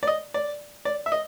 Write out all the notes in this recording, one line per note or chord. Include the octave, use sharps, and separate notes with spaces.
D5
D#5
D5
D5
E5
D#5